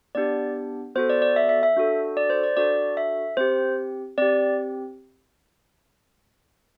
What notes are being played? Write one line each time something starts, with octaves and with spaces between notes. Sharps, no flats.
B3 D4 G4 D5
B3 F#4 A4 C5
D5
D5
E5
E5
E5
D4 F#4 A4
D5
C5
D5
D4 F#4 A4 D5
E5
C4 G4 C5
C4 G4 D5